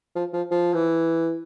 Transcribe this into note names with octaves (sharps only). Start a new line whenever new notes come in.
F3
F3
F3
E3